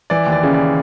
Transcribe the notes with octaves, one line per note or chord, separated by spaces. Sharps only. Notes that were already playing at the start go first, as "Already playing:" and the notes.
E3 D5
D#2
D5
C#3
D5